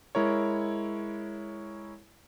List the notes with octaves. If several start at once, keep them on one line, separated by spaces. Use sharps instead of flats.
G#3 E4 A#4 C#5